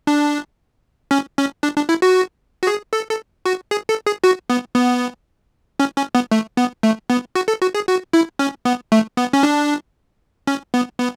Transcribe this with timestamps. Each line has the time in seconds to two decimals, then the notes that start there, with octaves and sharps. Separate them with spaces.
0.07 D4
1.11 C#4
1.38 C#4
1.63 D4
1.76 D4
1.89 E4
2.02 F#4
2.63 F#4
2.67 G#4
2.93 A4
3.09 A4
3.46 F#4
3.71 G#4
3.89 A4
4.06 G#4
4.24 F#4
4.50 B3
4.75 B3
5.79 C#4
5.97 C#4
6.15 B3
6.31 A3
6.57 B3
6.83 A3
7.10 B3
7.35 F#4
7.48 A4
7.62 F#4
7.75 G#4
7.88 F#4
8.13 E4
8.39 C#4
8.65 B3
8.92 A3
9.17 B3
9.33 C#4
9.43 D4
10.47 C#4
10.74 B3
11.00 B3